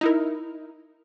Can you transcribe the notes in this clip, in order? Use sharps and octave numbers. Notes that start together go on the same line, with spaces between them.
D#4 E4 A#4